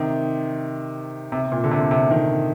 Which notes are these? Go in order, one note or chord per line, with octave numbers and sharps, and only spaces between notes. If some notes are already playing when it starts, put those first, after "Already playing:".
Already playing: C3 D#3
C3
A#2
D3
C3
C3
C3 D#3